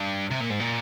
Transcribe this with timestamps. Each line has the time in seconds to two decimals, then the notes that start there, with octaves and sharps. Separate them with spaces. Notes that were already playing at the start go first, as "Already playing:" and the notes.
Already playing: G2
0.31 C3
0.41 A#2
0.50 G#2
0.60 A#2